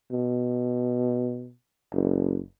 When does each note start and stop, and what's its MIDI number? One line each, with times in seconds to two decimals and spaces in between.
0.12 1.52 47
1.93 2.39 30